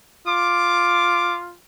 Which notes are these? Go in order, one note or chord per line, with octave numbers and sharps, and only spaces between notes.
F4 D6